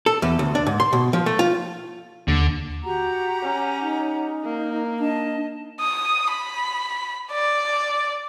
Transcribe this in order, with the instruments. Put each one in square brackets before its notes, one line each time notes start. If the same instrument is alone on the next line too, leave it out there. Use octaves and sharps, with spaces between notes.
[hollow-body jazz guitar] A4
E2
D2
D4
G#2
C6
B2
F3
A3
F4
[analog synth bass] D#2 [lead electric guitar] D3
[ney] F#4 [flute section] G4 F#5 A#5
[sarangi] C#4
[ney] D#4
[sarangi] A#3
[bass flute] D4 [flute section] D#5 A5
[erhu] D#6
B5
D5